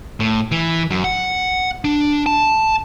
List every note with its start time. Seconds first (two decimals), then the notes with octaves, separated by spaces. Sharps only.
0.20 A2
0.52 E3
0.90 F#2
1.04 F#5
1.84 D4
2.26 A5